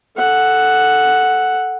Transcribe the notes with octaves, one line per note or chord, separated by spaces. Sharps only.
A4 F#5